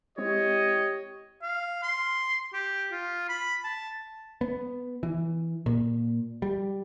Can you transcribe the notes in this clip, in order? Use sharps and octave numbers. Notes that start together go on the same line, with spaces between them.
G#3 C4 E4 G4 C#5 D#5
F5
C6
G4
F4
B5
A5
B3
E3
A#2
G3